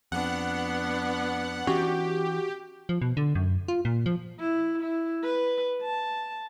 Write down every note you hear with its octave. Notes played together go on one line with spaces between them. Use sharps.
F2 B3 D4 F#5
E3 C#4 F#4 G4
F3
B2
D3
F#2
F4
A#2
F3
E4
E4
B4
A5